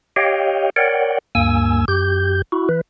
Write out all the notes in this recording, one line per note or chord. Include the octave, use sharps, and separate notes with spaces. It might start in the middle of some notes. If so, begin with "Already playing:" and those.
G4 C#5 D#5 F5 G5
A#4 C#5 D5 F#5 G5
D2 G2 A#3 G#5 E6
F#2 G4 G6
E4 F#4
E3 B4